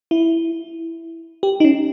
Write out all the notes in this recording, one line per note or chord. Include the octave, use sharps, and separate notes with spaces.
E4
G4
D#4
C#4